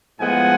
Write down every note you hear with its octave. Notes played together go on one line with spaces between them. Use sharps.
A2 F3 G#3 B3 F#5 G#5